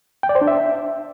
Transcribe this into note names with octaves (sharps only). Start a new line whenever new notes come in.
G5
D5
C5
D4
E5